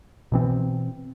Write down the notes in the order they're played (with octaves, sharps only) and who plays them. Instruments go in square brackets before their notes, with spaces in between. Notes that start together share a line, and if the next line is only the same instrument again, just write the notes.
[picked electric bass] B2 E3 C4